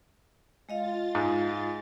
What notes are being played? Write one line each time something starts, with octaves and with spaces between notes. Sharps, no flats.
G#3 F4 D#5 F5 A6
G#2